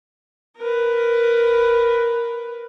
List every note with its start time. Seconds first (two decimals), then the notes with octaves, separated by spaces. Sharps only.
0.57 A#4 B4